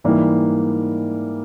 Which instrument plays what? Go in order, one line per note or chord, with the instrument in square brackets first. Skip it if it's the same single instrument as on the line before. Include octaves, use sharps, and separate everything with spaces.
[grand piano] G#2 E3 G3 A#3